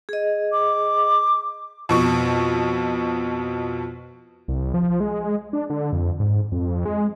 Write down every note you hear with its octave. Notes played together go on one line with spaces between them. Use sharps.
G#4 D#5
D6
F2 B2 C#6
C2
F3
G#3
D4
D3
F2
G#2
F2
G#3